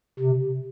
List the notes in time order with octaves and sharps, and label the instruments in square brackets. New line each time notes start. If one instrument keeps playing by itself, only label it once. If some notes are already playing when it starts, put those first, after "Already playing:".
[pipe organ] C3